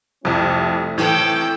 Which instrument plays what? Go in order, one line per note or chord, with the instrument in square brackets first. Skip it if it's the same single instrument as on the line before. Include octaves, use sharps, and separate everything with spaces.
[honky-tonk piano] C2 F2 [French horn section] A3 C4 E4
[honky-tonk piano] A2 E3 [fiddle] A4 G5